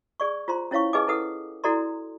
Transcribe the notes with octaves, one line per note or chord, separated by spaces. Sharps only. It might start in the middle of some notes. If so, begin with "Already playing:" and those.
G#4 D5 C#6
F4 C5 A#5 C6
C#4 E4 C#5 F5 C#6
D#4 G#4 B4 D#5 G#5 D6
E4 A4 B4 F#5 D#6
E4 F#4 A4 D5 A#5 C6